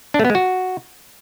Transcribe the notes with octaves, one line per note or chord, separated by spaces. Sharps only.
D4
A3
B3
G#3
F#4